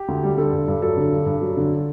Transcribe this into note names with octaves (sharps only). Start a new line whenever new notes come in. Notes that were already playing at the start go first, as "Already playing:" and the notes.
Already playing: G4
D2
G3
D3 A4
G2
G2
F#3 A4
D3
G2
G2
F#3
D3